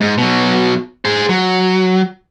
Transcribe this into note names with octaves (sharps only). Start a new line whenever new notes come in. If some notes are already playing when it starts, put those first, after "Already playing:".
G#2
B2 F#3
G#4 C5
F#3